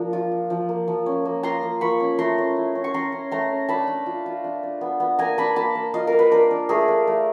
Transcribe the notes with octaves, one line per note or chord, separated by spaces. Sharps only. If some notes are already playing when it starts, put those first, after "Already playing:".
Already playing: F3 A#3 D4
F4
F4
F3
A#3
F3
C#4
A#3
F4 A#5 C6
A#3
A#3 B5 C#6
C#4
A3 A#5 C6
C#4
E4
C#4
C#6
C#4 A#5 C6
C#4
A3 A#5 C6
C#4
D4 A5 B5
D4
F4
F4
D4
D4
B3
B3
A#3 G#5 A#5
D4 A5 B5
A#3 A5 B5
A#3
F4 D#5 F5
A#4
A#3
B4
D4 A#4 C5
D4
A3 G#4 A#4
D4
A3